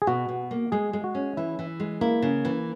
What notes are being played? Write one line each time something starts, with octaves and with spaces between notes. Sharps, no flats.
G#4
B2 F#4
B2
A#3
G#3 G#4
G#3
F#4
C#4
E3 E4
E3
G#3
A#3 E4
C#3
E3